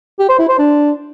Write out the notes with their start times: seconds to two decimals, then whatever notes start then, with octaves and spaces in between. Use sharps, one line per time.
0.19 G4
0.29 C5
0.39 E4
0.49 C5
0.58 D4